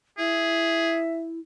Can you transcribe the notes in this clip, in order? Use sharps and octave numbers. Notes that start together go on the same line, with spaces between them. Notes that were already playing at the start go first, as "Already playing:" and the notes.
E4 G#4 E5